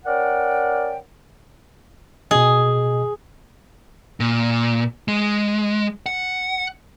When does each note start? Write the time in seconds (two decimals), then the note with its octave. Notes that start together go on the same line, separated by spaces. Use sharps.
0.05 C#4 A#4 D5 F#5 G5
2.31 B2 G#4 D#5
4.20 A#2
5.08 G#3
6.06 F#5